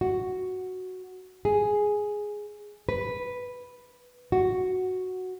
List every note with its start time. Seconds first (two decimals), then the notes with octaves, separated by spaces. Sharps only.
0.01 F#4
1.45 G#4
2.89 B4
4.32 F#4